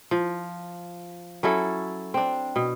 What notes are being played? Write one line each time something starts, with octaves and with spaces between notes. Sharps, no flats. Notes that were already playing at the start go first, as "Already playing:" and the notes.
F3
F#3 C#4 E4 A4
C4 D4
B2